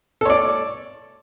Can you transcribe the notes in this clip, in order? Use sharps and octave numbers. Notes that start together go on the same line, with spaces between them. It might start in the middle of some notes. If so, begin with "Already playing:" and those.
A4 C#5 D5